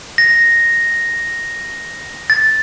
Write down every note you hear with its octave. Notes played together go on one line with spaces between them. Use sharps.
A#6
A6